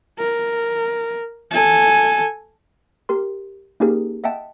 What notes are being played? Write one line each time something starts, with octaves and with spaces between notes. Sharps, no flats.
A#4
A4 G#5
G4 A#4 C6
A#3 C#4 D#4 G4 G#4 A#4
D#5 E5 F#5 G5 A5